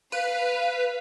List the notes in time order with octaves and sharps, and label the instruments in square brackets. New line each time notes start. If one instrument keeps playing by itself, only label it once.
[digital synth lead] B4 [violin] F5